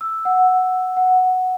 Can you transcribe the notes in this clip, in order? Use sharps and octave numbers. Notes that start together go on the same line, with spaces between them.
E6
F#5
F#5